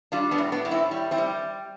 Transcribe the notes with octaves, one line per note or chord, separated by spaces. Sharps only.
G3 D4 F4
B3 D4
A2
B3 D4
A2
C4 E4
G3
C4 E4
G3